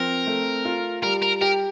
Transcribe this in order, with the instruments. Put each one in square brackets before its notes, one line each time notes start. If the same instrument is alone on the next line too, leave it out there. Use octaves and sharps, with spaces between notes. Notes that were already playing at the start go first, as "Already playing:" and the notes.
Already playing: [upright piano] F3 C4 [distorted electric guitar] A#4
[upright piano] A3
F4
[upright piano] G3 [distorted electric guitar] A#4
[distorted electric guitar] A#4
[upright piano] G4 [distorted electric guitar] A#4